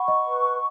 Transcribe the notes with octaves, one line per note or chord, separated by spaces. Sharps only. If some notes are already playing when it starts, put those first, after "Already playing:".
Already playing: F#5 B5 C#6
D#5
B4